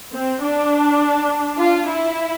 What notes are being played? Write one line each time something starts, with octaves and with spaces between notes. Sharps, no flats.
C4
D4
F4
E4